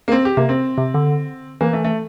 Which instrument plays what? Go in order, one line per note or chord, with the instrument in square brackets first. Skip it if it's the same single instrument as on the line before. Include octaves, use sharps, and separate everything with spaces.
[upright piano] A#3
C4
G4
[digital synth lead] C3 [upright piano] A#3
[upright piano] C4
[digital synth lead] C3
D3
[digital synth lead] E3 [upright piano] A#3
[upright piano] A3
A3